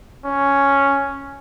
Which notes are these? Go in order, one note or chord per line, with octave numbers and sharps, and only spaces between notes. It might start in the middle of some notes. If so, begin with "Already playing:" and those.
C#4